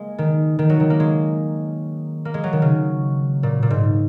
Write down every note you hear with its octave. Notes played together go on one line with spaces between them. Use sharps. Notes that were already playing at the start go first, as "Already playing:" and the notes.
Already playing: G#3 A#3
D#3
D#3
F#3
D#3
A#3
G#3
A#3
G#3
F#3
D#3
C#3
A#2
A#2
G#2